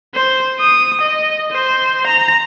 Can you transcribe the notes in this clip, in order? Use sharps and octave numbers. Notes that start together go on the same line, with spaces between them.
C5
D#6
D#5
C5
A#5